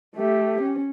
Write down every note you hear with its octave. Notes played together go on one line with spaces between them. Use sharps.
A3 G4
C#4